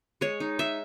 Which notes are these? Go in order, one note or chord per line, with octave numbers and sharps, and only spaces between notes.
G#3 C#5
D#4
G#3 E5